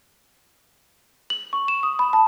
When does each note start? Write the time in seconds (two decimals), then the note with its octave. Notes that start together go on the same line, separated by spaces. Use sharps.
1.30 F#7
1.53 C#6
1.68 E7
1.83 D#6
1.99 B5
2.13 A5